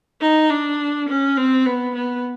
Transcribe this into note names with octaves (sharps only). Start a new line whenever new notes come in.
D#4
D4
C#4
C4
B3
B3